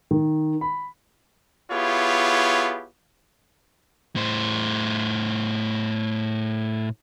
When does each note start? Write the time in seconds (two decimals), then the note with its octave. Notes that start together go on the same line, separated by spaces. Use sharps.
0.11 D#3
0.61 B5
1.70 B3 E4 F4 G4 G#4 C#5
4.16 A2 C5